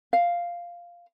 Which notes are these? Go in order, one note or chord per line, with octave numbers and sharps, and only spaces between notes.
F5